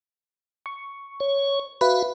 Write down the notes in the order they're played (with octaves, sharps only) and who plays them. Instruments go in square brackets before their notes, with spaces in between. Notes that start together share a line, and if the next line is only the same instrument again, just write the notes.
[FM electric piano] C#6
[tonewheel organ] C#5
[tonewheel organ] F#4 E5 F5 [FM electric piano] B4